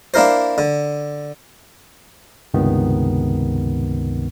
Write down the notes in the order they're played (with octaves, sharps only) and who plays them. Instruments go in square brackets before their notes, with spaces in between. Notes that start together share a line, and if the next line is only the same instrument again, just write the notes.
[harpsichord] A#3 D4 E4 A#4 C5
D3
[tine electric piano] C#2 G2 C3 D#3 B3